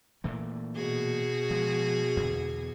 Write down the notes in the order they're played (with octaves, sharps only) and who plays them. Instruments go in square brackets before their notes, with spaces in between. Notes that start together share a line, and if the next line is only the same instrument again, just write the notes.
[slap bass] A#2 E3 A3
[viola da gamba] B2 F#4 G#4
[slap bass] F3 G#3
E2 D3